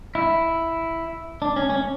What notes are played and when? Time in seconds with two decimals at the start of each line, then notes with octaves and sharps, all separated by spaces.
0.15 E4
1.42 D4
1.56 C#4
1.70 C#4